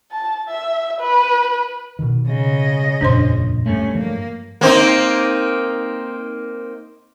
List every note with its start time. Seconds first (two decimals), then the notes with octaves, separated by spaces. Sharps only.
0.12 A5
0.49 E5
1.00 B4
1.99 B2 D#3
2.27 C#3 D#5
3.01 E1 A#1 F#2 D4 C5 C6
3.66 G2 A3 C#4
3.95 F3 A#3
4.61 A#3 C4 D#4